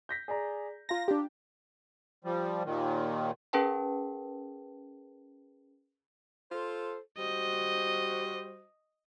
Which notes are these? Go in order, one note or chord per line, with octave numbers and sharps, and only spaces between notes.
G6 A#6 B6
G#4 D5 A#5
F4 F5 A#5 A#6
D4 G4
F3 G3
D#2 A#2 D#3
C#4 G#4 A#4 B4 G5 A5
F4 A4 C5
G3 F#4 C5 D#5